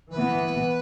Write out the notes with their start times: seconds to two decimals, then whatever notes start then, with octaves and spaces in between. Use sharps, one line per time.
0.11 E3 B3 B4